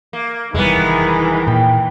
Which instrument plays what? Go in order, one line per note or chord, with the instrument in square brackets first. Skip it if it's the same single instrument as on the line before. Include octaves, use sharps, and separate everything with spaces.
[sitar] A#3
[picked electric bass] F1 G3 [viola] D#3 E3 [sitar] G#3 B3 [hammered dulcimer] E5
[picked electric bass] A#2 [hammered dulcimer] G5